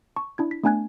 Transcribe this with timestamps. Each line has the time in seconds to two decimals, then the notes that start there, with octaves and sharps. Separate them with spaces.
0.16 A5 C#6
0.38 D4 E4 G#6
0.51 B6
0.63 A3 B3 D4 G#5 F#6 G#6